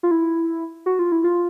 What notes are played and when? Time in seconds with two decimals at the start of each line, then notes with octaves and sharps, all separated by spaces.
0.03 F4
0.11 E4
0.86 F#4
0.99 F4
1.12 E4
1.24 F4